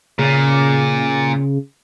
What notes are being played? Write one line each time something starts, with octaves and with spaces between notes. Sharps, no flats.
A#2 C#3